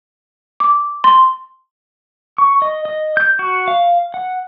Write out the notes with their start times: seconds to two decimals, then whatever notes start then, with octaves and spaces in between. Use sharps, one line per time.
0.60 D6
1.04 C6
2.38 C#6
2.62 D#5
2.85 D#5
3.17 G6
3.39 F#4
3.68 F5
4.14 F#5